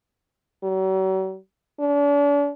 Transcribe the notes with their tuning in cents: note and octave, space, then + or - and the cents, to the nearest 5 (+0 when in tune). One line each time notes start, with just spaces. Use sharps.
F#3 +45
D4 -40